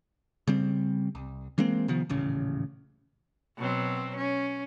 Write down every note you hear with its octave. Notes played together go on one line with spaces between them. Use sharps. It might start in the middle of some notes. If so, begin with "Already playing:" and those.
C#3 G3 C4
C2
E3 G#3 A#3 C4
C3 D#3 F3 B3
D#1 A1 C#3
B2 F#3 C4
C#4